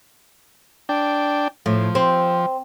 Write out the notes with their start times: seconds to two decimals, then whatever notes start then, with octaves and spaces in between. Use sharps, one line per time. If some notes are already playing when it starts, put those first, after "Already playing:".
0.89 D4 G5
1.66 A2 F3
1.95 C4